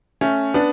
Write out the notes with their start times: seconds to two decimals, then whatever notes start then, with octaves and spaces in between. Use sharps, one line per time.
0.21 A3 C#4
0.54 B3 D4